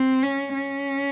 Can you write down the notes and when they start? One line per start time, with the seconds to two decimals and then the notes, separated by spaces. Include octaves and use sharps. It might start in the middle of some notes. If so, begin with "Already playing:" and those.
Already playing: C4
0.23 C#4
0.54 C#4